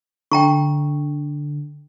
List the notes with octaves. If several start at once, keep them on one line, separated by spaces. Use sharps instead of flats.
D3 G5 A#5 C#6